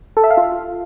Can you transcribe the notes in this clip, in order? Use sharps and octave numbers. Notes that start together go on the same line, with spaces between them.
A4
E5
F5
F4